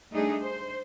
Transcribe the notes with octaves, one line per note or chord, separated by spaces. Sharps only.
G3 A3 D4 D#4 G#4
C5